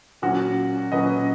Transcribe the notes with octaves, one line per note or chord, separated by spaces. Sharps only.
A#2 F#3 C#4 F#4
A#2 F#3 C#4 B4 D#5